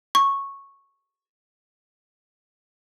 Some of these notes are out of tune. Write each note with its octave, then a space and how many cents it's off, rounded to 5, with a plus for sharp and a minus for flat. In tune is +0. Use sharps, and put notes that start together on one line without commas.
C#6 -5